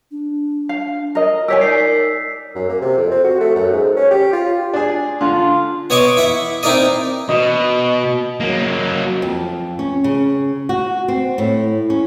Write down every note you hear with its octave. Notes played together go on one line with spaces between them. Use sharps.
D4
F5
A#4 D#5
G4 A#4 C#5 G#5 E6 B6
D#4 D5 C7
F#2
A#3
C3
F2
C4
F#4
A3
F#2
G#2
C#4
G4
F4
D4 G#4
D3 F4
B3 C#5 D#5 C#6 D6
E4 E5 F#5
C4 D#4 E4 A#4 D5 D#5
B2 D#5
F#3 A#3
F2
C#4
C#3
F#4
C4
A2
C#4